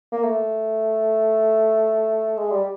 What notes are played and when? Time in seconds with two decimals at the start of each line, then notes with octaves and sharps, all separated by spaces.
0.12 A#3
0.23 A3
2.37 G#3
2.52 G3